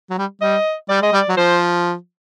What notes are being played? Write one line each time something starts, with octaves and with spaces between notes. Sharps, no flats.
F#3
G3
G3 D#5
G3 D5
G#3 D#5
G3
D5
F#3
F3 C5